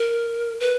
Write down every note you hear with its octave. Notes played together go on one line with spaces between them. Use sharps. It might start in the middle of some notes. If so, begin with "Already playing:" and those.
Already playing: A#4
B4